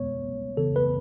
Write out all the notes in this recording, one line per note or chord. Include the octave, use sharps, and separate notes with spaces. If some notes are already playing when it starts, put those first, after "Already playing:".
Already playing: B2 G#3 B3 C#5
C#3 E3 B3 A4
B4